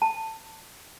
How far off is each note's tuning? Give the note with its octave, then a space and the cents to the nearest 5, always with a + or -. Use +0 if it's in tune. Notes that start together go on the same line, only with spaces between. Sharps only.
A5 +15